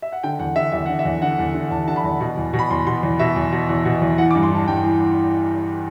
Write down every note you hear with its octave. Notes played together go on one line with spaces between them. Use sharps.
E5
F#5
D3 G5
E2 F#5
D3 E5
E2 E5
D3 F#5
E5
E2
D3 F#5
E2
D3
E2 A5
D3 A5
B5
E2
B2
E2
B2
B5
E2 C6
B2 C6
E2
B2 E5
E2
B2
E2
B2
E2
E3 F#5
D6
G2
C6
E3 A5
G2 G5
E3